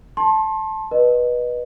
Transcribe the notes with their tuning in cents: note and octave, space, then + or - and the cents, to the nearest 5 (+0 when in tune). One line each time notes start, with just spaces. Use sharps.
A5 -10 C6 +35
B4 -20 D#5 -20